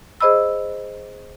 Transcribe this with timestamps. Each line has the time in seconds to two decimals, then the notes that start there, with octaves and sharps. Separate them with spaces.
0.20 G#4 C5 D#5 B5 E6